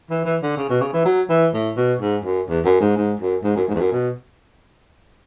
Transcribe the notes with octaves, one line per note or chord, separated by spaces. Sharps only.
E3
E3
D3
C#3
B2
C#3
E3
F#3
E3
A2
B2
G#2
F#2
E2
F#2
G#2
G#2
F#2
G#2
F#2
G#2
E2
F#2
B2